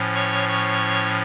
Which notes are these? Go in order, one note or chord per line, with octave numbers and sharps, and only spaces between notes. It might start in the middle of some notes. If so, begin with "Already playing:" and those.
Already playing: A2 F3 C#4
C#5 C#6
C#5 C#6